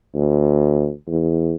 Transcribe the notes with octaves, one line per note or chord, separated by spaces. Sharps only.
D2
E2